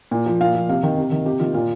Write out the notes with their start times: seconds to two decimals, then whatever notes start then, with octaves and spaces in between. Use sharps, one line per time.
0.11 A#2
0.26 F3
0.41 A#2 F5
0.54 F3
0.69 C3 F5
0.83 D#3
0.97 C3
1.11 D#3
1.26 C3 G4
1.40 D#3 F4
1.54 A#2 F4